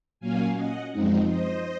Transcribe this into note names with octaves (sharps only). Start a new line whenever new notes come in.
A#2 F#3 A#3 C#4 F5 G#5
D#5 F#5
F#2 F3 G#3 C4 D#4
C5 D#5